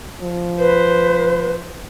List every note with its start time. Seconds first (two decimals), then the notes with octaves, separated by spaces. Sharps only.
0.22 F3
0.59 B4 C5